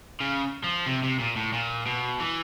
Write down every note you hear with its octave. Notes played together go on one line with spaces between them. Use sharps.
C#3
F3
C3
C3
A#2
A2
A#2
B2
E3